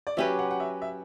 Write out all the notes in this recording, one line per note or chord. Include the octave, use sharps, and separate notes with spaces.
D5
F#3 C#4 G4 B4 E5
F#5
F#5
E5
E5